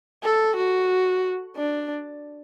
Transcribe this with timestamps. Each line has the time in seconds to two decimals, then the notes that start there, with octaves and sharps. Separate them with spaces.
0.23 A4
0.56 F#4
1.56 D4